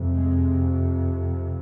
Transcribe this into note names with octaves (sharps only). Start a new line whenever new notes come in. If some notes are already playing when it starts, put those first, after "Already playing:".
Already playing: F2 C3
G#3